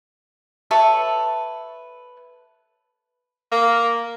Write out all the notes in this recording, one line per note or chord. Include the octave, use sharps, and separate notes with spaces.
A4 B4 C#5 E5
A#3